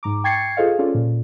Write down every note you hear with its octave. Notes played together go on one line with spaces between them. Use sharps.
G#2 A#5 D6
G5 C#6 G#6 A6 C7 C#7
F4 G#4 A4 C5 D#5 F5
C#4 F4 A4 D5
A#2